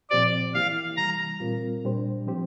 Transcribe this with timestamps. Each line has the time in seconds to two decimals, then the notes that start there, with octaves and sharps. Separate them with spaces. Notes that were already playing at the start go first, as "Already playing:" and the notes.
0.10 A#2 F3 C4 G4 C5 D5
0.54 E3 A#3 E4 G4 F5
0.97 C3 E3 G3 A#5
1.40 A#2 G3 C4 F4 A#4
1.84 A#2 G3 D4 G4 C5
2.27 F3 C4 G4 C5